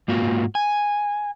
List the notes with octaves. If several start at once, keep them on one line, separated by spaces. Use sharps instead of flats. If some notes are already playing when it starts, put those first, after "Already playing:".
G#2 A#3 F4 F#4
G#5